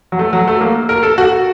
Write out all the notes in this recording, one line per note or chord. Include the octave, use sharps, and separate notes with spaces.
F#3
A3
F#3
A3
A#3
A#4
A4
F#4